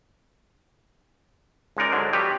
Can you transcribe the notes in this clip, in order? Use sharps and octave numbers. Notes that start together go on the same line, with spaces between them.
C#2 G#3 D#4 A#4 D5
G#2 D3 F#3 G#3
F3 G3 C4 G4 B4 C#5